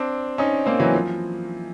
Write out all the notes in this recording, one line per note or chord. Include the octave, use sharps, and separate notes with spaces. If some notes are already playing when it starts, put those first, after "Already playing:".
Already playing: C4 D4
C#4 D#4
A#3 C4
E3 F#3
F3